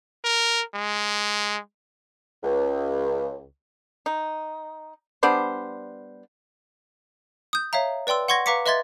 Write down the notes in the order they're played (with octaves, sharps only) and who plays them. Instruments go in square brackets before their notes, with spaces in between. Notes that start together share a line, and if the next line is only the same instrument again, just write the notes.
[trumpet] A#4
G#3
[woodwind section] C#2
[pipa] D#4
G3 B3 D4 C5
[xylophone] D#6 G6
C#5 E5 F5 A#5
B4 D5 G5 C6 E6
F#5 C6 C#6 G#6 A#6
B4 F5 A#5 D6 B6 C#7
B4 D#5 E5 C6 G#6 A6